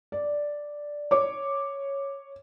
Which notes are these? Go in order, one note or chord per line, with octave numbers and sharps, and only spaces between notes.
D5
C#5 D6